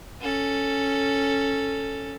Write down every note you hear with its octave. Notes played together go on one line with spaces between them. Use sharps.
C#4 A4